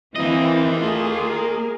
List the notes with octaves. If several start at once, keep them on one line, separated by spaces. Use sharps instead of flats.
E3 A#3 C4 D#5
A3 F4 G#4
A#4